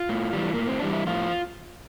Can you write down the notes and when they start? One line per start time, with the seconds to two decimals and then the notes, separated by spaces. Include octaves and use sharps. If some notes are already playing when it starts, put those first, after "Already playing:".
Already playing: F4
0.09 A2
0.33 E3 G3
0.54 A2 A#3
0.67 C4
0.80 E3 G3 D4
0.93 E4
1.07 A2 F3 F4